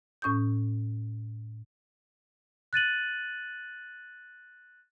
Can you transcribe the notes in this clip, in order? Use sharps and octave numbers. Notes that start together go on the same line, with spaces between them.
A2 C#4 C#6 D#6 G6
F#6 A6 D#7 F#7